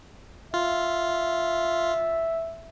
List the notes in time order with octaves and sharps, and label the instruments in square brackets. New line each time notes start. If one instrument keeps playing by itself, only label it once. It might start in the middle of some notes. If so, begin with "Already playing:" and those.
[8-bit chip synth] F4 [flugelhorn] E5